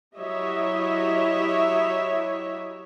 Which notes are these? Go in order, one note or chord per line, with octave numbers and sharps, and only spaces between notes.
F#3 E4 G4 C#5 D#5 E5